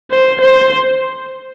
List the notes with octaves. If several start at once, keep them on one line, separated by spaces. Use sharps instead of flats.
C5
C5